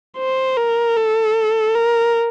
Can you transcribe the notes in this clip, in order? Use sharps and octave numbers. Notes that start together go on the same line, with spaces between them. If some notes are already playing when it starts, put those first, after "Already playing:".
C5
A#4
A4
A#4